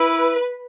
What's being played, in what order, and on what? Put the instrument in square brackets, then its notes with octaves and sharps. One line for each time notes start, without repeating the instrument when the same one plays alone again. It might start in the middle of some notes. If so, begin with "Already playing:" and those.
Already playing: [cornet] E4 [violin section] B4